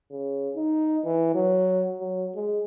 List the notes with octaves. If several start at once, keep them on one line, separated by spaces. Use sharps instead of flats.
C#3
D#4
E3
F#3
F#3
G#3